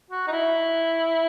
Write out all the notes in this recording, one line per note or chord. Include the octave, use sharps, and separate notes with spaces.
F#4
D#4
E4